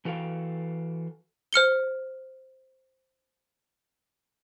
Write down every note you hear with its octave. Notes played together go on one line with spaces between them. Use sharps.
E3 F#4 A4 F5 G5
C5 F6 C#7 G7